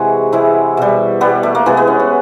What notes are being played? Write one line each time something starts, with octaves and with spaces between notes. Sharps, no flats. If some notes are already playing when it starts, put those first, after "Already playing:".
Already playing: C3 E3 G#3 F#4
C3 E3 G#3 E4
B2 G3
B2 G3 B3
A3
A#3
C3 E3 G#3 B3
B3
C#4
F#4